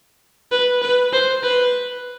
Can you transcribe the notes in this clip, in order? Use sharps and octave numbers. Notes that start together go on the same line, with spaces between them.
B4
B4
C5
B4